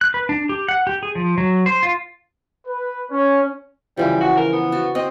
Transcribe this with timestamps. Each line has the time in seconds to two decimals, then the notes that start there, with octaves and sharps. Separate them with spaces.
0.01 F#6
0.14 B4
0.29 D4
0.49 G4
0.68 F#5
0.87 G4
1.03 G#4
1.15 F3
1.38 F#3
1.66 C5
1.83 F4
2.68 B4
3.11 C#4
3.97 C#3 E3 F3 G3
4.21 F#4
4.37 A#4
4.52 B3
4.72 F#4 A5
4.95 C4 D#5